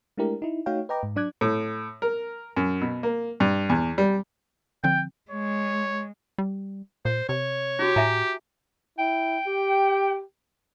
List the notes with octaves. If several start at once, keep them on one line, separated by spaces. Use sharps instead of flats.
G#3 A3 D4 E4 G4 A#4
D#4 E4
A3 D#4 F#4 C#5 F5 G5
B4 D#5 G5 A#5 D6
G#2
F#3 D4 D5 D6 F#6 G#6
A2
A#4
F#2
B2
A#3
G2
E2
G3
D3 F3 C4 G5
G#3 C#5
G3
A#2 C5
C3 C#5
E4 F#4 G4
A2 E5 G#5 A#5
E4 G5
G4